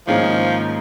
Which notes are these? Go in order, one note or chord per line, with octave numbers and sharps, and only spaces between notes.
G#2 D#3 F3 A#3 C#4 G#4